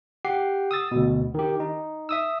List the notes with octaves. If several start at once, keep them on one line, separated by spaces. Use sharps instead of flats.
G4 F#5 C7
D#6 E6 A6
D2 B2
D#3 G4
D#4
E5 D#6 E6